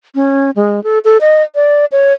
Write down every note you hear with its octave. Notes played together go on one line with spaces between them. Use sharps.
C#4
G#3
A4
A4
D#5
D5
C#5